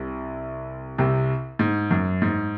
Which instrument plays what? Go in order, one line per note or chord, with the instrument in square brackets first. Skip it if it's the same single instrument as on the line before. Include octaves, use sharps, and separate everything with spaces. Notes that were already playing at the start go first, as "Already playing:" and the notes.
Already playing: [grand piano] C2 C3
C2 C3
G#2
F#2
G#2